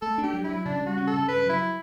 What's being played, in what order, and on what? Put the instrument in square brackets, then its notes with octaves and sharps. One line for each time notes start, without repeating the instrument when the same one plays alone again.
[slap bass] A3 [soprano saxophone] A4
[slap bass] D4
[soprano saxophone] G4
[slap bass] F#3
[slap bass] F#3 [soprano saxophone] E4
[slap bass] C#3 [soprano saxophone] D4
[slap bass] G3
[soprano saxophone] F#4
[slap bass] C#4
[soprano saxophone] A4
[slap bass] C#3
[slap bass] G2 [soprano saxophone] B4
[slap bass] F#3 [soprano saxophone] E4